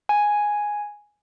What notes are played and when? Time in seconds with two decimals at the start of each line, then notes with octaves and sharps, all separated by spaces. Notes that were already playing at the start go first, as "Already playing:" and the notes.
0.09 G#5